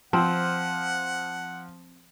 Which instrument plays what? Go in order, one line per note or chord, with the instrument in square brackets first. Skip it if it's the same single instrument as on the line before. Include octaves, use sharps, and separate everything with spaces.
[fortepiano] F3 [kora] C4 [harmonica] F#5